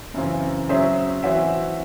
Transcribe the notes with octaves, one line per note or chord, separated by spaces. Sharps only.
F#2 C#3 E3 C4
F#3 C#4 G#4 C5 E5
E3 C4 F#4 C#5 E5